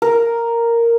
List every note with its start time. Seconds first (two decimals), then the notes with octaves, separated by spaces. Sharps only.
0.02 A#4